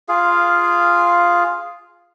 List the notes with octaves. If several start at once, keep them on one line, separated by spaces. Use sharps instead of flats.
F4 G#4 F5